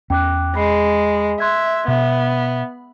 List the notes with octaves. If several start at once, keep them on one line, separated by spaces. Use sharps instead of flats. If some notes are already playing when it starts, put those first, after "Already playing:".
E2 C#4 G5 D6 F#6
G#3 B5 C7
E5 C6 F#6 G#6
B2 B3 E5